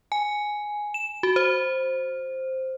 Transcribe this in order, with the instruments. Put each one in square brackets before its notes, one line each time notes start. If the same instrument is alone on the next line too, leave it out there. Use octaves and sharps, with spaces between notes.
[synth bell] G#5
E7
F#4
C5